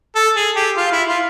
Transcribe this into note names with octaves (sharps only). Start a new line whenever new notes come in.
A4
G#4
G4
F4
E4
F4